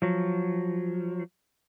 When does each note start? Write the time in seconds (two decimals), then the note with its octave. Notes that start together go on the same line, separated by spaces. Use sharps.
0.02 F3 F#3